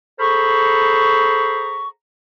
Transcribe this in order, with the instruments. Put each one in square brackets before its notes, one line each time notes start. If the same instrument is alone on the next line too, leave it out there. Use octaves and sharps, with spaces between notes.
[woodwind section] G#4 A4 C5 A#5 B5 C#6